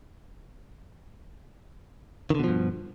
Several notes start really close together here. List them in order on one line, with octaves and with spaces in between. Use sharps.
D#3 D3 B2 F3 G2